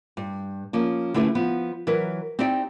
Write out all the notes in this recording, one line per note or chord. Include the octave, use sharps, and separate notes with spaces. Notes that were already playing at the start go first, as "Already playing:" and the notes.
G2
F3 A#3 C#4
D3 A3 C#4 E4 G4 B4
F3 B3
E3 F#3 A#4 B4
C4 D#4 E4 G4 D5 G5